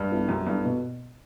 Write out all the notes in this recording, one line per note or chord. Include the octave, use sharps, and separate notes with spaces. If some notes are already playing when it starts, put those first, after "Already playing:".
Already playing: G2
B3 E4 A4
F#2 G3
G2 B3 E4 A4
B2